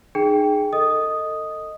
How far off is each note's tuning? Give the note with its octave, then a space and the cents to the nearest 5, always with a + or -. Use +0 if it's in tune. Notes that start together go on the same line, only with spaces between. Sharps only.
D#4 -30 G#4 +5 G5 +0
A4 +30 D#5 +0 D#6 +0